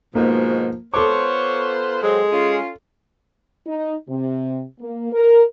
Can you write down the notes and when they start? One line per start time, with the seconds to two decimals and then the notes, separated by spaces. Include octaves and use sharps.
0.15 G#2 B2 F3 A#3
0.94 B3 F4 A4 C5 C#5 D6
2.03 F#3 G#3 C4
2.31 C#4 F4
3.67 D#4
4.09 C3
4.80 A#3
5.13 A#4